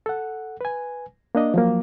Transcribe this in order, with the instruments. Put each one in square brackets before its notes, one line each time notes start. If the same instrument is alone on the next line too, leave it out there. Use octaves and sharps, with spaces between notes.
[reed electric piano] A4 F#5
B4 G#5
A#3 D4 D#5
F3 F#3 A#3